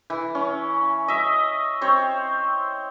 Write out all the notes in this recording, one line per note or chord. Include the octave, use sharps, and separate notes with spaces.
E3
C#4
D#5 E5
C4 C5 C#5